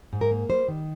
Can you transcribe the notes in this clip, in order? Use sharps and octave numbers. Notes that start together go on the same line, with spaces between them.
G#2
A#4
A#3
G3 C5
D#3